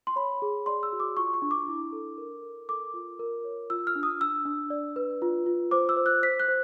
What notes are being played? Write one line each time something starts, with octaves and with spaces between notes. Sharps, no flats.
C6
C#5 B5
G#4
D5 C6
E6
F#4
D6
F4 C#6
C#6
D4
D6
E4
A4
A#4
A#4
A4 D6
F4
A#4
C#5
F4 E6
F6
D4
D#6
D4 E6
D4
D5
B4
F4
F4
C5 D6
E6
C5
F#6
C5 B6
F#6
C5